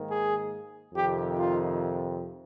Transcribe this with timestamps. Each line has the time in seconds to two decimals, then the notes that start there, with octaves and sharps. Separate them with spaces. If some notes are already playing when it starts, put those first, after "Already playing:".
Already playing: G#2 D#3 A#3
0.09 G#4
0.93 F2 C3 D#3 G4
1.35 F4